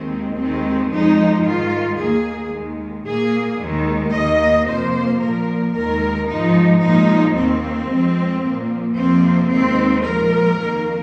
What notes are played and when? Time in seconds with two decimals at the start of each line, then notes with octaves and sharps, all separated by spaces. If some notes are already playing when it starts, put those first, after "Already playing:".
Already playing: D#2 D#3 G#3 C4
0.38 D#2 D#3 G#3 C4
0.92 F2 F3 G#3 D#4
1.45 G#2 D#3 G#3 F4
1.99 D#2 D#3 A#3 G#4
2.53 D#2 D#3 G#3
3.06 A#2 A#3 G#4
3.60 D#2 D#3 G#3
4.14 D#2 D#3 A#3 D#5
4.67 F2 C3 F3 A#3 C5
5.21 A#2 F3 A#3 A#4
5.75 D#2 D#3 G#3 A#4
6.28 G#2 F3 G#3 D#4
6.82 A#2 F3 G#3 D#4
7.36 D#2 D#3 A#3 C4
7.89 F2 F3 G#3
8.43 A#2 F3 A#3
8.97 F2 C3 F3 A#3 C4
9.50 D#2 D#3 G#3 C4
10.04 A#2 F3 G#3 A#4
10.58 F2 D#3 A#3